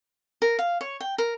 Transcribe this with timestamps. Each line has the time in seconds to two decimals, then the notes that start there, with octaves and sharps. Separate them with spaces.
0.42 A#4
0.59 F5
0.81 C#5
1.00 G5
1.18 A#4